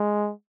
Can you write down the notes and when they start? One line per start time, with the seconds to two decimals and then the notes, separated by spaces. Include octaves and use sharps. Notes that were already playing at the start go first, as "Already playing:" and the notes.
Already playing: G#3